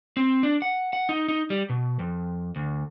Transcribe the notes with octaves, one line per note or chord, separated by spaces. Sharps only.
C4
D4
F#5
F#5
D#4
D#4
G3
B2
F2
D2